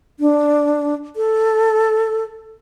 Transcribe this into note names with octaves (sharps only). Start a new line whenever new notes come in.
D4
A4